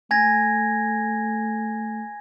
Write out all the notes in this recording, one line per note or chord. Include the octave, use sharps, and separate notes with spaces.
A3 G#5 G#6 A#6